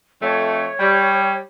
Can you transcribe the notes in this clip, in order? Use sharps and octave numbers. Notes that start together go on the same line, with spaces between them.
F2 A3 C#5
G3